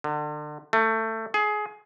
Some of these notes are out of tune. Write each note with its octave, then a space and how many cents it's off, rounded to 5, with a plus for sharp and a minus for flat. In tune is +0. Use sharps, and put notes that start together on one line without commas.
D3 +35
A3 +20
G#4 +20